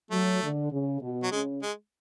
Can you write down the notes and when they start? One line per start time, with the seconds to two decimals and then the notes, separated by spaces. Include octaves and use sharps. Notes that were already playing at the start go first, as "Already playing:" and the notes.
0.11 F#3 A3
0.42 D3
0.71 C#3
1.01 B2
1.23 F#3
1.31 C#3 G#3
1.62 G#3